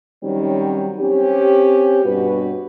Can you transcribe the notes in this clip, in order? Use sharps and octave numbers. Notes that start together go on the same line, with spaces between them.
D#3 F#3 G3 C4 C#4
C4 C#4 G4
G2 B2 F#4 B4